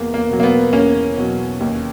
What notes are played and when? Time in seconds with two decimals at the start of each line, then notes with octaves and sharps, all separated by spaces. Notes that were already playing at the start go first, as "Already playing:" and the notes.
Already playing: E2 A#3
0.14 A#3
0.29 B2 F#3
0.40 A#3
0.43 B3
0.73 E2 A#3 C#4
1.17 B2 F#3
1.60 D#2